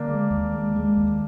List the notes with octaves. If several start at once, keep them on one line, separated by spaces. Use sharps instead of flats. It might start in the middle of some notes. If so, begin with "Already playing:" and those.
Already playing: D3 A#3 D4
G#3
D#2
G#3
G#3
D#2